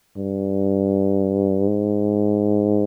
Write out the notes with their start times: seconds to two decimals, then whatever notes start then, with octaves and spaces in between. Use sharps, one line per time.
0.17 G2
1.68 G#2